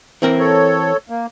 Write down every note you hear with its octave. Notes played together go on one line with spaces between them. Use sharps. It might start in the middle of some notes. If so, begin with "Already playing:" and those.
E3 C4 A#4
A4 C#5
A#3